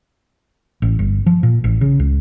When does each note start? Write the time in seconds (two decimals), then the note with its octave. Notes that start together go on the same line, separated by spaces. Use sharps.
0.82 A1
0.99 G1
1.26 F3
1.43 A#2
1.64 A1
1.81 C#3
1.99 C#2